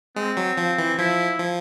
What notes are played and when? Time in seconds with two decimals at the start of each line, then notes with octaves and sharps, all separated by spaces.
0.16 G#3 C4
0.37 F#3
0.58 F3
0.78 E3
0.98 F3 E4
1.40 F3